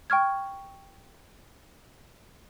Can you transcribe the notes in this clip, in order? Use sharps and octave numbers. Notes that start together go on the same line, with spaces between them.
G5 C#6 F6 G#6